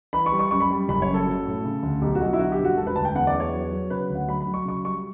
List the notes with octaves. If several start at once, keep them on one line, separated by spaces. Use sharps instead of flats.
E3 B5
C#6
G3
C#6
F#2 C#6
B5
G3
F#1 B5
C#5
F#2
A4
F#3
A2
C#3
D2
B1 G4
F#4
B1
F#4
E4
D3 F#4
G4
G2
F#4
E1 A4
B4
D2 A5
G5
E2 F#5
D5
E2
C#5
F#3
F#3
C#3 B4
D2
F#5
F#3 B5
B5
F#3
C#6
C#3 C#6
G3 C#6